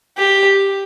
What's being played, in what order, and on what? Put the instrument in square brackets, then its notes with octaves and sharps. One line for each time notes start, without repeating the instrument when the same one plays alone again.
[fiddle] G4